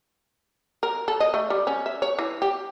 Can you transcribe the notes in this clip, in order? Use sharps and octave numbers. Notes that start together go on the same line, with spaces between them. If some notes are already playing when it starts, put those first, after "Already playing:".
A#4
A4
D#5
A3
G3
C#4
E5
C#5
E3
G4